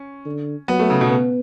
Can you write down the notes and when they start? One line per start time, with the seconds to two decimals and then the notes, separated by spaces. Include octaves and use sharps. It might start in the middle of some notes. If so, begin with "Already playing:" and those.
Already playing: C#4
0.26 D3
0.68 F#3 B3
0.79 A3
0.90 C#3
1.01 B2
1.11 B3